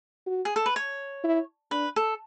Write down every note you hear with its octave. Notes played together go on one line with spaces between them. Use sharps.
F#4
G#4
A4
B4
C#5
E4
D4 B4
A4